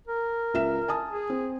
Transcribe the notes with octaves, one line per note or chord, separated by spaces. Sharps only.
A#4
C#2 E5 E7
G#5 A5 D#6
G#4
C4